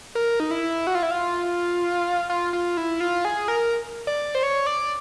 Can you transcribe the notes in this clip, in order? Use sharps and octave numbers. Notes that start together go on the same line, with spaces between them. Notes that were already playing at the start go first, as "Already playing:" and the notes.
A#4
D#4
E4
F#4
F4
E4
F4
F4
F4
E4
F4
G#4
A#4
D5
C5
C#5
D5